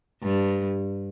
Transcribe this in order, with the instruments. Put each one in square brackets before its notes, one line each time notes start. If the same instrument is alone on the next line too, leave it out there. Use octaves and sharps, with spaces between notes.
[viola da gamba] G2